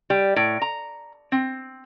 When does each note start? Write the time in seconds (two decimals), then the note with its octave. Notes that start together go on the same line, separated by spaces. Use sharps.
0.10 G3
0.36 A2
0.62 A#5
1.32 C4